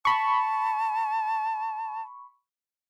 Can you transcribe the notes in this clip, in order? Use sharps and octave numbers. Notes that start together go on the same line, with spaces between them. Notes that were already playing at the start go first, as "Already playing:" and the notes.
A5 B5 C#6